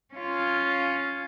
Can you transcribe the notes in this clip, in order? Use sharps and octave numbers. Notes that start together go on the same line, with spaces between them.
C#4 F4